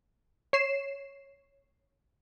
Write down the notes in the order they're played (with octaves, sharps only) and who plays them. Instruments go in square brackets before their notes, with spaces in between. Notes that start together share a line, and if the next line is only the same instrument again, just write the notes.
[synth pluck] C#5 C7 E7